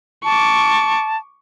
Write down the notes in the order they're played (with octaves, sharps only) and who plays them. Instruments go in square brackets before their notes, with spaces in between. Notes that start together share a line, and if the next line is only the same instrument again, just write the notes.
[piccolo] A5 [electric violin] C#6 D6